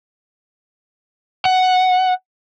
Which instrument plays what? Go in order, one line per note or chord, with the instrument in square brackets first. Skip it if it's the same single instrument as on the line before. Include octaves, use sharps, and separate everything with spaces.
[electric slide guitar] F#5